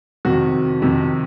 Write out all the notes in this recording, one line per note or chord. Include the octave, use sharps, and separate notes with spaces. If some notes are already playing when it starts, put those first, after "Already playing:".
F2 C3 D#3 F#4
F2 C3 D#3